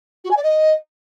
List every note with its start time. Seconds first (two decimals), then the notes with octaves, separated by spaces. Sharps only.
0.24 F#4
0.30 G#5
0.36 D5
0.43 D#5